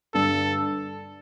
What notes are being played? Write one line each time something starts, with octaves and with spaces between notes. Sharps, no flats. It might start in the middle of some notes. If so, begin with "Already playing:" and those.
G2 D3 G3 A4